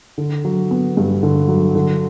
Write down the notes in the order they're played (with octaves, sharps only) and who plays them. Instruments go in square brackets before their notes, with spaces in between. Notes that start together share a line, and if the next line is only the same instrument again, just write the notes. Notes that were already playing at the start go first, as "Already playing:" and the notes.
[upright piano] D3
F#3
B3
G2
D3
F#3
D3